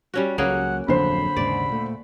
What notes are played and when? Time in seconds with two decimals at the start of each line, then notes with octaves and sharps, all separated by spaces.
0.14 G3 C#4 F#4
0.38 C#2 F#3 A#3 C#4 G#4 F#5
0.88 D1 F2 D3 F#3 C5 B5
1.37 D#2 G#2 C#3 D5
1.69 A#2 A3